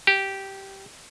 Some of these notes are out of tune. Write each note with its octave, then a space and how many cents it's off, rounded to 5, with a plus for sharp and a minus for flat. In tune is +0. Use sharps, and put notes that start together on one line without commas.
G4 -10